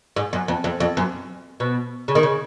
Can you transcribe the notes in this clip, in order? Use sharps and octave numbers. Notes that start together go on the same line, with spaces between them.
G#2
F#2
F2
F2
F2
F#2
B2
C#3
D#3
C#3